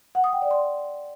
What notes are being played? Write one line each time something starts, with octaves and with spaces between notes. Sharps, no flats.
F#5
D#6
G5
D5
C6